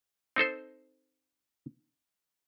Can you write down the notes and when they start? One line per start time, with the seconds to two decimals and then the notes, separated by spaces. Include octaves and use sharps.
0.36 C4 D#4 A4 C5